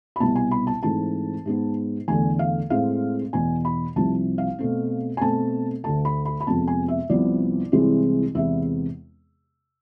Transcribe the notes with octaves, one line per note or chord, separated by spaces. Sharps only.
B5
C2 B2 B3 A5
G#5
B5
A5
G#2 E3 A3 C4 A5
G#2 G#3 B3
E2 D3 A3 G#5
F5
A2 G#3 C4 F5
E2 B2 B3 G#5
B5
C2 C3 F3 A5
F5
B2 A3 C4
G#5
B2 A3 C4 A5
D2 D3 A3 A5
B5
B5
B5
F2 C3 G#3 B3 A5
G#5
E5
C2 C3 F3 B3 D5
C2 C3 E3 G#3 C4
E2 C3 G#3 B3 E5